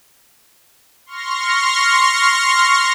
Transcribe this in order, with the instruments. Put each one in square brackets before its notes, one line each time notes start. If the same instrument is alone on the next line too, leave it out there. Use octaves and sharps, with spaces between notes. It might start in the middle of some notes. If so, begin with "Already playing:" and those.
[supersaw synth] C6 C#6 F6 A#6